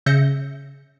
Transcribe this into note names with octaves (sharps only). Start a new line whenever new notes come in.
C#3 E5 G6 A#6 C#7